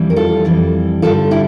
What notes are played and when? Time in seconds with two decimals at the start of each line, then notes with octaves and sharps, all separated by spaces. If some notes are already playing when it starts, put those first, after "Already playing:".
Already playing: F2 E3 G3
0.10 A#4
0.16 F4 A4
0.45 F2 E3 G3
1.02 G2 D3 G3 F4 A4
1.31 E4 G4